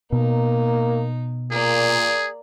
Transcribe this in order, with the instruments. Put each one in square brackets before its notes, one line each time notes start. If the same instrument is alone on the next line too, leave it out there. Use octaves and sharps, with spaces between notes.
[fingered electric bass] B2 [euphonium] A#3 [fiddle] D#4
[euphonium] A#2 [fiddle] A#3 D5 [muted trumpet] G#4